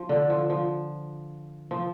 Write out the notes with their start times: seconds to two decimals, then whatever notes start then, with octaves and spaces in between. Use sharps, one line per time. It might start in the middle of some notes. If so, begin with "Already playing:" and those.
Already playing: F3
0.09 D3
0.30 F3
0.50 F3
1.71 F3